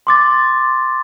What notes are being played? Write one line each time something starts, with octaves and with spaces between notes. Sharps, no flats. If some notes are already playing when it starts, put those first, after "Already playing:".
C6 D6 A6